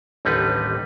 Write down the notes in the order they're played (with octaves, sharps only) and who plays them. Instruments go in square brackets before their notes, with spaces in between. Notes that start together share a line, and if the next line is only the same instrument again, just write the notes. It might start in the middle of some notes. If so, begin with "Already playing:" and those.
[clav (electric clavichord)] A1 D#2 D3 G3 D#4 B4